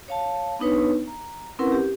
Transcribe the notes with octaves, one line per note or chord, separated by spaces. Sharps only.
C#5 F5 A5
B3 D4 D#4 B4 C#5
A#5
C4 C#4 E4 A#4 B4 F#5
G4